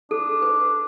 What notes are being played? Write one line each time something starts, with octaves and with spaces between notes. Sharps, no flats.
D4 A4
B4